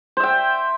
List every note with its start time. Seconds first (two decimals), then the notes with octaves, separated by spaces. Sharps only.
0.17 C5
0.20 E5
0.23 G5